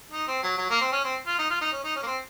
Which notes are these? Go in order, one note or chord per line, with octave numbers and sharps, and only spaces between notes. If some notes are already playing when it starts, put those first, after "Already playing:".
D#4
C4
F#3
F#3
A#3
C4
C#4
C4
F4
D#4
F4
D#4
C#4
D#4
C#4
A#3
C4